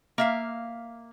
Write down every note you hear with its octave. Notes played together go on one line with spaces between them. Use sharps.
A#3 E5 F5